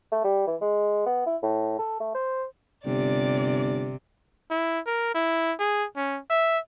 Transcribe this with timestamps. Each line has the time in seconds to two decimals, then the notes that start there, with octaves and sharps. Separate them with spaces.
0.12 A3
0.24 G3
0.47 E3
0.61 G#3
1.06 B3
1.26 E4
1.43 A2
1.78 A4
2.00 A3
2.14 C5
2.86 G1 C3 D5
4.51 E4
4.86 A#4
5.15 E4
5.59 G#4
5.97 C#4
6.30 E5